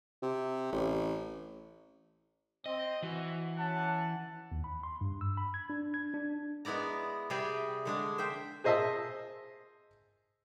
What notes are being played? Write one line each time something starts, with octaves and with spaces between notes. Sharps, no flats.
C3
A1
C4 D#5
E3 F#4
C#4 F#5 A5
D#2
B5
C6
G2
E6
B5
G#6
D4
G#6
D4
G#3 B3 E4 D5 A#5
C3 G3 G#4 D5 E5 G5
D3 G#3 D4
C5 E5 G5
G#4 C5 D#5 E5 A5 D#6